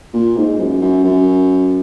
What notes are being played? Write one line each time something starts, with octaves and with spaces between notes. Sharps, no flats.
A#2
G#2
F#2
F#2
F#2